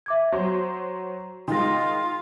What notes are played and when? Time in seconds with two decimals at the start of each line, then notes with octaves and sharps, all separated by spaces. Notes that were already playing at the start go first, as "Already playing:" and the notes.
0.06 E5 D6 G#6
0.32 F#3 F#4 C5
1.48 D#3 G#3 F4 C6 A#6